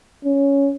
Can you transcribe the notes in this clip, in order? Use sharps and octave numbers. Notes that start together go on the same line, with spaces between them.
C#4